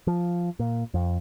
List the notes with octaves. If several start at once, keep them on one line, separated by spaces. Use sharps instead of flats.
F3
A#2
F2